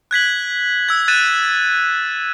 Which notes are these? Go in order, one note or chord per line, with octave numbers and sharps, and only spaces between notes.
F#6 G#6 B6 F#7
E6 G#6
F#6 A6 D#7 E7